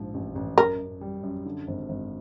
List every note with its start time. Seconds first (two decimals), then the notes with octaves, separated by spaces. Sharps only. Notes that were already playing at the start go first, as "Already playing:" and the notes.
Already playing: A#1 G#2 F3
0.14 A1
0.35 A1
0.58 F#2 A#4
0.79 F#2
1.01 G3
1.23 F#2
1.46 D3
1.68 G#1
1.89 G#1